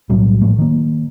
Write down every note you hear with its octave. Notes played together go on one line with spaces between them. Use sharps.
B1 A2 F#3 G3
A2 F3 A3
D#3 A#3